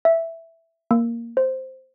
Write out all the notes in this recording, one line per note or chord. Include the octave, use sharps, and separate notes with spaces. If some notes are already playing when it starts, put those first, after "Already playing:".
E5
A#3
C5